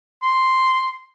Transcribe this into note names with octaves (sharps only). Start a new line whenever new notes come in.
C6